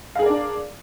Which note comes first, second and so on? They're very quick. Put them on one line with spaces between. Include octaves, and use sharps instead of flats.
F5 G#4 A#4 D5 D4